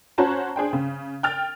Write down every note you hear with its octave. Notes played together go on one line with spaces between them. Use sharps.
C#4 F#4 C5 C#5 A5 A#5
D4 G#4 C5 G5
C#3
G5 F6 A6